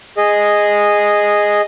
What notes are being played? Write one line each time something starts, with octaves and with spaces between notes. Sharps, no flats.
G#4 D#5